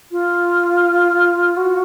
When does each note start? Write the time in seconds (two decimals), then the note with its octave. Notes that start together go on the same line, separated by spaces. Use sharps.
0.12 F4
1.57 F#4